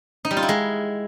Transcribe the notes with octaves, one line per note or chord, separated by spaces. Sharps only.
D#4
G3
F4
E4
G#3